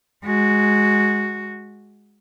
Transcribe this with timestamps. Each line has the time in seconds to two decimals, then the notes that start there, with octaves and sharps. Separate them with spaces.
0.24 G#3 F#4